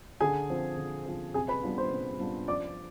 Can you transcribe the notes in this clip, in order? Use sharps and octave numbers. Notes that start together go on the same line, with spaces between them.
D3 G#4 G#5
F3 C4
D3
F3 C4
C3 G#4 G#5
B4 B5
G3 B3 D4 F4
C5 C6
C3
G3 B3 D4 F4
F3 D5 D6